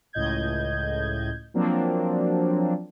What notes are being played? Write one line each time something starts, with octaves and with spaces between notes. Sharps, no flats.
C#2 A2 D#5 G6 G#6
F3 F#3 A#3 C4 D4